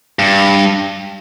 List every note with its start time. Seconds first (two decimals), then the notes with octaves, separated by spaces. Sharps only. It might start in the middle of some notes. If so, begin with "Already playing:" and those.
0.19 G2